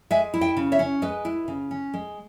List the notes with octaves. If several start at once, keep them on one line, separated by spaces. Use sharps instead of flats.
G#3 E5 G#5
E4
D#5 G5
C#3
C#5 E5
C#4
G#3 B4 D#5
E4
C#3
C#4
G#3